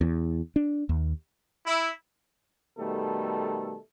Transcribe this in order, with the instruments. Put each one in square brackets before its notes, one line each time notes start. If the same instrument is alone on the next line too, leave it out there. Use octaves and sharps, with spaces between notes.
[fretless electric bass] E2
D4
D#2
[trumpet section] E4
[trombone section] B2 D#3 G3 A3 A4